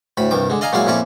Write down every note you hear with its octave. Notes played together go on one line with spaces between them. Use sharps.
D2 A2 B5
C2 G2 D#3 D6
D3 G#3
D5 D#5 F5 G#5 A#5
A#2 F#3 G#3 E4 D5 F5
F2 A#2 C#4 E4 D5 C#6